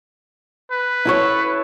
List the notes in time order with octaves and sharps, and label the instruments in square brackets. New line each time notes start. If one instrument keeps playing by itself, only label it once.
[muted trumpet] B4
[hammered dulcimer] E4 A4 C#5